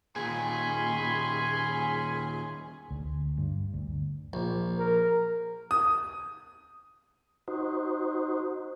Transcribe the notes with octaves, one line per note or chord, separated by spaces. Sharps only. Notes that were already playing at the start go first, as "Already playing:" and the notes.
D#2 A#2 C#4 G#4 G#5 B5 C6
D2
G2
D2
A#1
A#4
D#6
D#4 F#4 C5